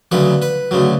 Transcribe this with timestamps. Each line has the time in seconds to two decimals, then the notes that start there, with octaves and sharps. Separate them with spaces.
0.12 D2 C#3 F#3 B4
0.42 B4
0.71 D2 C#3 F#3